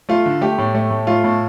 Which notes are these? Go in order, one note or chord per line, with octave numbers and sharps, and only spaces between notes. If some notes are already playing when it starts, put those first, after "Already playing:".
A3 F4
D3
A3 G4
A2
A3
A2
A3 F4
A2